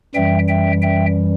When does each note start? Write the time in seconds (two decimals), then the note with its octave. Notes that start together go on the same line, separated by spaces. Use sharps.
0.15 F#2 E3 G3 E5 G5
0.48 E5 G5
0.82 E5 G5